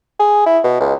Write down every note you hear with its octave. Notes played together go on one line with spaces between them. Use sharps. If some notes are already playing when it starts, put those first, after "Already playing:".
G#4
E4
B2
C#2